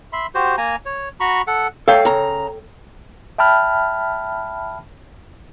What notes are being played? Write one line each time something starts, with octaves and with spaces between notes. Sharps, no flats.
E5 B5 C6
F#4 G4 C5
A#3 G#5 A#5
C#5
F#4 A#5 B5 C#6
A4 F#5
A4 C#5 F5 G5
C#3 A#5
E5 G5 A5 B5 F6